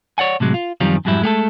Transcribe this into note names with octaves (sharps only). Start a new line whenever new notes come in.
C#5 D5 F#5 G#5
A2 C3 F#3 G#3
F4
F#2 D#3 F3 G3 C4 F4
F2 G#2 F#3 G3 E4
G#3 A3 G4 A4